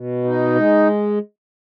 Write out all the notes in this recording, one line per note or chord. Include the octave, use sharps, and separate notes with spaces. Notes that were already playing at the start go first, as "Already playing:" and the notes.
Already playing: B2
D#4
G#3